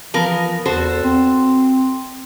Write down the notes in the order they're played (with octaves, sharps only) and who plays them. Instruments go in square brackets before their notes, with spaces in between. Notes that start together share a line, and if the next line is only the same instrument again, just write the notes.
[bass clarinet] E3 [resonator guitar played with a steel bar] F3 B3 A#4
[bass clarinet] E2 [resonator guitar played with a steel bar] F#4 A4 C5
[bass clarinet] C4